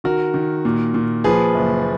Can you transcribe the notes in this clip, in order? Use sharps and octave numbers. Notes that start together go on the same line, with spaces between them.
D#3 F#4 A#4
D#3
A#2
A#2
F3 G#4 B4
F#1